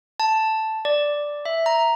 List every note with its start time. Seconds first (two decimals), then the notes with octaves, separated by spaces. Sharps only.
0.20 A5
0.85 D5
1.45 E5
1.66 A#5